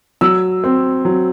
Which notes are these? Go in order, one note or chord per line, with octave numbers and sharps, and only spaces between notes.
F#3 E6
C4
F#3